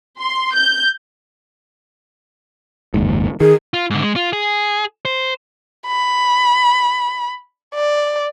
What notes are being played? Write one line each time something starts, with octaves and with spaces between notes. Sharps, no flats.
C6
G6
F#1 D#2 G#2
D#3 G#4
F4
G#2 D3
G#3
F4
G#4
C5
B5
D5